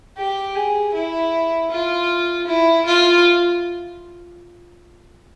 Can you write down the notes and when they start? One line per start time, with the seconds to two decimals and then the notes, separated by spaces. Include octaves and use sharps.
0.17 G4
0.55 G#4
0.94 E4
1.71 F4
2.47 E4
2.86 F4